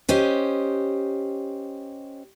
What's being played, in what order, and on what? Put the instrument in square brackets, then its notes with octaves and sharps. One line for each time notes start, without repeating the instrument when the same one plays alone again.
[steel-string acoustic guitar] C#4 G4 C5 D#5